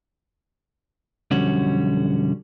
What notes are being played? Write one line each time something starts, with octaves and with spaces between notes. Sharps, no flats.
B1 F2 D3 G3 C#4 F#4